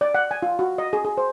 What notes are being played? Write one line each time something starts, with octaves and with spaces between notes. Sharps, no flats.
D5
F#5
G#5
F4
F#4
D#5
G#4
G#4
C5